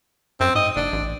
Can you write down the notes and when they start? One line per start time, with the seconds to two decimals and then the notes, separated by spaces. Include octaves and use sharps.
0.40 F#2 C4
0.55 G#2 D#5
0.76 F#1 D4
0.93 A1